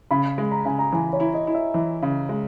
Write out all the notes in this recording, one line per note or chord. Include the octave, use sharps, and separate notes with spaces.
C#3 B5
G#3
A#5
C#3 G#5
A#5
E3 G#5
C#5
E4
D#5
E4
E5
E3
C#3
G#3